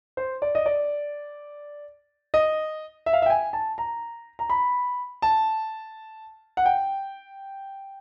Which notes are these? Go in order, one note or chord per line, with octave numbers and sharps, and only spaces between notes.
C5
D5
D#5
D5
D#5
E5
F5
E5
G5
G#5
A5
A#5
A#5
B5
A5
F#5
G5